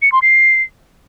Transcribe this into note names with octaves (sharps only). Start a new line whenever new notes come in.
C#7
C6
C7